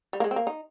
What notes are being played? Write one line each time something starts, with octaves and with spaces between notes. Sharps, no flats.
G3
A#3
G#3
C4
A#3
D#4